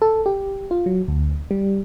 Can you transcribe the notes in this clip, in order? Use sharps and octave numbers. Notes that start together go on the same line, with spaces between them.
A4
G4
F4
F#3
D2
G3